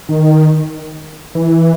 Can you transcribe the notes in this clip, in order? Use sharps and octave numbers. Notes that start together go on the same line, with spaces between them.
D#3
E3